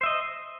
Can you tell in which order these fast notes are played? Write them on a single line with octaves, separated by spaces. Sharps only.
C5 E5 D#5